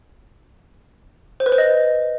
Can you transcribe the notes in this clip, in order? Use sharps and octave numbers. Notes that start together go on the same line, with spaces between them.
C5
B4
C5
D#5